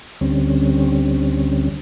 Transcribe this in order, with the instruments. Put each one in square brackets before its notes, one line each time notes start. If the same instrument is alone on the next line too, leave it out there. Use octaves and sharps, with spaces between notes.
[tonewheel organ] D2 D3 G3 C4 C#4